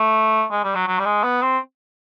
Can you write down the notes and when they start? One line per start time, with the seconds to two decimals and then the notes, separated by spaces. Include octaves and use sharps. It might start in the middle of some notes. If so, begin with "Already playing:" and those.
Already playing: A3
0.51 G#3
0.64 G3
0.75 F#3
0.87 F#3
0.99 G3
1.05 G#3
1.24 B3
1.42 C4